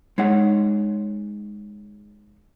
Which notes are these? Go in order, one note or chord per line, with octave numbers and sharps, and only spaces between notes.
G#3 D#4 G#4 C#5 F#5